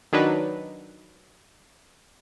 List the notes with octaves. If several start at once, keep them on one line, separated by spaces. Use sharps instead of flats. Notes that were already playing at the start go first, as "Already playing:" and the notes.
D#3 F#3 D4 D#4 B4